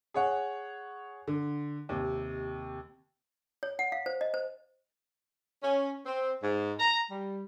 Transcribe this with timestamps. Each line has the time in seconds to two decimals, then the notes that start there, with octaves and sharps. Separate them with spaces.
0.14 G#4 C#5 F#5
1.27 D3
1.89 D#2 C3
3.63 C#5
3.79 F#5
3.92 F5
4.06 C5
4.21 D#5
4.34 C5
5.63 C#4
6.06 C4
6.43 G#2
6.79 A#5
7.11 G3